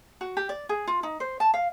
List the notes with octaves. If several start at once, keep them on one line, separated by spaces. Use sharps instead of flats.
F#4
G4
D5
G#4
F4
D#4
C5
A5
F5